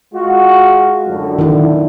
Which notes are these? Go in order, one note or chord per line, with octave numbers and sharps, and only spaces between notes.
G#3 F4 F#4
F#2 A2 D3
D#3 E4